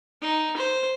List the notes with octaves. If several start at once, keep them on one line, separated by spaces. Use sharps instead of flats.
D#4
C5